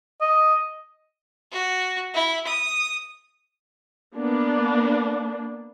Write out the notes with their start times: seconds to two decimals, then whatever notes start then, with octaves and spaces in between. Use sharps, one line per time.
0.21 D#5
1.52 F#4
2.14 E4
2.47 D#6
4.16 A#3 B3 D4